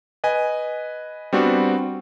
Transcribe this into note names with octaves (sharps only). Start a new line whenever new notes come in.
B4 D#5 G#5
G3 B3 C4 D4 F#4